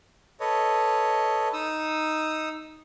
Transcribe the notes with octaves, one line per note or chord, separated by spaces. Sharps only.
A4 B4 C#5 D#5
D#4 D#6 E6